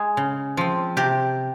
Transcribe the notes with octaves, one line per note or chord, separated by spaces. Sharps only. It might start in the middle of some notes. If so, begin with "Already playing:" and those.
Already playing: G#3 G#4
C#3
F3 C4
C3 G4